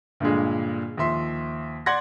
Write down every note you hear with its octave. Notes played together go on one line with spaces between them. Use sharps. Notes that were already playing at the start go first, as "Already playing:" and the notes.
G2 A#2 D3 G#3
D#2 F3 E5 C6
D5 F#5 C6 G#6 A#6